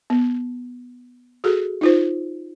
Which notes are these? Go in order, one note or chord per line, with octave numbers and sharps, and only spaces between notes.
B3
F#4 G#4 A4
D#4 F4 C5